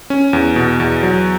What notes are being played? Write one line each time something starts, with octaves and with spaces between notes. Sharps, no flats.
C#4
E2
B2
E2
F#3